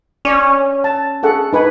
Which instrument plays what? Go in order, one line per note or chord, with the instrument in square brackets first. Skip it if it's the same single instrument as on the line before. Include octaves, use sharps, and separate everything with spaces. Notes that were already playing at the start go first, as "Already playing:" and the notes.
[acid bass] C#4 [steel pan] D5
[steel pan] A5
G#4 A4 F#5
D#4 B4 G#5